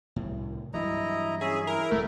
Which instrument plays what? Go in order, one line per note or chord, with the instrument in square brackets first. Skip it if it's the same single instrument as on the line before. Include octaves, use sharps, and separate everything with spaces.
[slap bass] C2 A2
[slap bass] G2 E3 F#3 [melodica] E4 D#5 A#5
[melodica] C#4 E5 [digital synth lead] G#4
[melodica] E4 [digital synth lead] A#4
[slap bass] D1 C2 [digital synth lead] A3